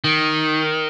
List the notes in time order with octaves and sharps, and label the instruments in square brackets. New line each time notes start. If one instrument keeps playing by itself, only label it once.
[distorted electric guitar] D#3